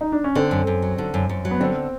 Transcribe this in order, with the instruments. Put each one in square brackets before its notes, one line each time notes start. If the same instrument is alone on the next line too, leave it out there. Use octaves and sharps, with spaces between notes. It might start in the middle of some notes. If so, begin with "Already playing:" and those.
[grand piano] D#4
D4
C#4
[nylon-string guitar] D3 [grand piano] C4
[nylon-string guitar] F#2
F#2
F#3
D3
F#2
F#2
F#3
[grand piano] B3
[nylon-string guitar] D3 [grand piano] C4